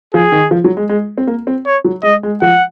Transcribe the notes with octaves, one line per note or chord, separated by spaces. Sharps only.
F3 G#4
D#3
F3
F#3
G#3
G#3
C4
A#3
C4
C#5
F#3
G#3 D#5
G#3
F3 F#5